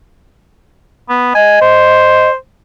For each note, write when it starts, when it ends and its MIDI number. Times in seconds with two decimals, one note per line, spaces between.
1.09 1.31 59
1.35 2.30 75
1.35 1.58 80
1.62 2.35 72